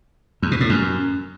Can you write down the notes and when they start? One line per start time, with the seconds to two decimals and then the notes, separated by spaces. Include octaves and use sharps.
0.42 E2
0.51 B2
0.60 A2
0.69 F#2